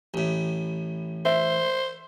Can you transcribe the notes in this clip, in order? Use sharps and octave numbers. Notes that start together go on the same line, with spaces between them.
A1 A2
C5 E5